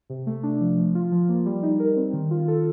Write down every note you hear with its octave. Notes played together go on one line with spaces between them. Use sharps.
C3
A3
D4
F3
F3
F4
F3
A#3
G3
D#4
A#4
C4
D#3
F4
A4